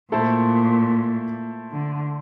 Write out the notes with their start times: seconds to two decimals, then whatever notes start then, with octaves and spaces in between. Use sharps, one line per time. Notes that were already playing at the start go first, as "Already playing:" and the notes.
0.12 A#2 A3 E4 A4 C5
1.72 D3